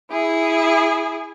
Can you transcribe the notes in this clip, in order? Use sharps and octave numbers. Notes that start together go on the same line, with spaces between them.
E4 G#4